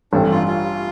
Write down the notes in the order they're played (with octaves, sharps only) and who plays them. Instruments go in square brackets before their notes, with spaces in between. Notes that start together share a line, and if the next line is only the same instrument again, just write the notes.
[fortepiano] A1 G2 G3 C4 A4 [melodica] D4
[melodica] F4
F4